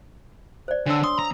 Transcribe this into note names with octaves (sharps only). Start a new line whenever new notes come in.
C5 D5
D3 D4 C#5 E6
C6 D#6
A#5